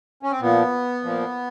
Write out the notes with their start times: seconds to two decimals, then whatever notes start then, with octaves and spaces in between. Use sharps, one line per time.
0.23 C#4
0.31 C4
0.41 A#2 F3 B3
1.03 A#2 F3